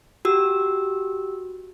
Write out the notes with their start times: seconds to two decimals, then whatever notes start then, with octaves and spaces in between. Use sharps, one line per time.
0.25 F#4 G4 E6